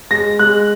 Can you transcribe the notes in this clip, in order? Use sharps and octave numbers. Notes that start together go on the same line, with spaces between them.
G#3 A#6
G#3 F#6